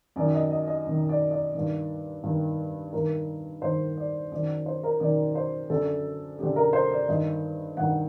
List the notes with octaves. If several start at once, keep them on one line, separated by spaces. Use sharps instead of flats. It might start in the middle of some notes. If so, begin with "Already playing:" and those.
F#2 D#3 D5
D#5
D#5
D#5
F#2 D#3
D5
D5
G2 D#3
G2 D#3
G2 D#3 A#4
G2 D#3 C5
D5
F#2 D#3 D5
C5
A#4
F#2 D#3 D5
C5
F#2 D3 A4
F#2 D3 G4
A#4
C5
D5
G2 D#3 D#5
G2 D#3 F#5